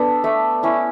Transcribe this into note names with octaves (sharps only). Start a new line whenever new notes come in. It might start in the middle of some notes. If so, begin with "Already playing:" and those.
Already playing: B3 D4 A4 B4
A3 E5
C#4 E4